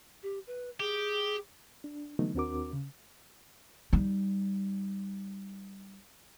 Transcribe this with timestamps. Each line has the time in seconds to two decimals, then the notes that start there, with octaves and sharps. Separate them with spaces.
0.23 G4
0.47 B4
0.80 G4 G#4
1.84 D4
2.19 D3 E3 F#3 A3 B3 D#4
2.35 D#2 C4 D4 F#4 A#4 D6
2.73 C#3
3.93 G3 D#4